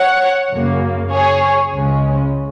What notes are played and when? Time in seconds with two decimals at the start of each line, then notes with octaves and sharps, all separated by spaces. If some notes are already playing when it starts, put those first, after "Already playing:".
Already playing: C#5 F#5
0.52 F#2 C#3 A#3
1.12 G#4 C#5
1.74 C#2 C#3 G#3 C#4